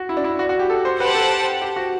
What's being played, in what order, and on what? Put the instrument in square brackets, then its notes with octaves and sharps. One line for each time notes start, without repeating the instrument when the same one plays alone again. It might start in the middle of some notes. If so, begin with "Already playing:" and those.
Already playing: [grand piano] F#4
E4
D4
E4
F#4
F#4
G4
A4
C5
[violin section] G4 C5 F#5 A5 [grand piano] B4
[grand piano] A4
G4
F#4